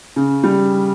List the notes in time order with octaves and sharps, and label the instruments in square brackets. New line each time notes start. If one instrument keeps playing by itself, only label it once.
[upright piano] C#3
G3